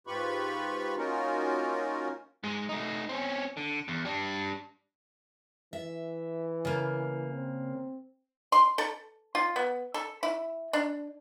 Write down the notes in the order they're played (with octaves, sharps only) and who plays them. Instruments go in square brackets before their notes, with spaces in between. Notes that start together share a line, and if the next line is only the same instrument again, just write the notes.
[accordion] G#2 F4 G4 B4 B5 C#6
A#3 C#4 D#4 F4 F#4 A#4
[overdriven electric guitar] G#2 G#3
A3 D#4
C4 C#4
D3
E2
G3 D4
[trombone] E3 [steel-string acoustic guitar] E5
[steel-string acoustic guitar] C#3 A#3
[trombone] C4
[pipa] C6
A4
F4
B3
A4
E4
D4